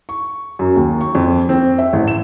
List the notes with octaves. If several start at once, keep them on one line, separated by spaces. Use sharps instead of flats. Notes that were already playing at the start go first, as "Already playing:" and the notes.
C#6
F#2
D#2
C#6
F2
C4
E5
A1
E7